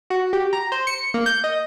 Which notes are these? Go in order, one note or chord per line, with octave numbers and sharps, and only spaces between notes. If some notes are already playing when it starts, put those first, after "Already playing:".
F#4
G4
A#5
C5
C#7
A#3
G6
D#5